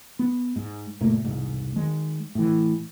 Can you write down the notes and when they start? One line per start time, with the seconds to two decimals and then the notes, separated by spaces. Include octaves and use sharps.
0.19 B3
0.56 G#2
1.01 F#1 A#2 A3 A#3
1.24 E1 C2 G#2
1.76 D#3 G#3
2.35 A2 E3